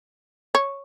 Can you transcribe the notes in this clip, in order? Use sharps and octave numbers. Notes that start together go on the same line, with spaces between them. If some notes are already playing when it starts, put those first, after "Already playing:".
C#5